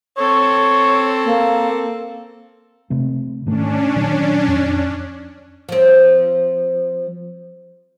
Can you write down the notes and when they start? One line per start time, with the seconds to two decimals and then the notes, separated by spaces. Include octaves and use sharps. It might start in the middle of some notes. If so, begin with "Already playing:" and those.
0.18 C4 A4 C#5
1.24 A#3
2.90 C3 A3 C4
3.46 G#2 D#3 A3 C#4 D4
3.96 A#2 D#3 F#3
4.48 F2
5.69 F3 C4